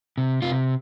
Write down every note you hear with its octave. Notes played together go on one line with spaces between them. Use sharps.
C3
C3 F4